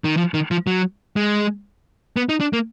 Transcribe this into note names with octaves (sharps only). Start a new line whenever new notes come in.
D#3
F3
D#3
F3
F#3
G#3
B3
D#4
D4
A#3